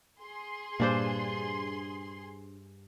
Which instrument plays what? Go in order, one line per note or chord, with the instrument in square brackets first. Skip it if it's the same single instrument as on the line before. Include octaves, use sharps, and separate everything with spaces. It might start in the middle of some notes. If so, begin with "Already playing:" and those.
[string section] G#4 C6
[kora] G2 D4 C5 [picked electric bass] A#2 A#3